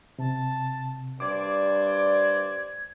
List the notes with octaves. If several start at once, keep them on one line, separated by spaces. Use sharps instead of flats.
C3 A5
G2 C5 D5 D6 G#6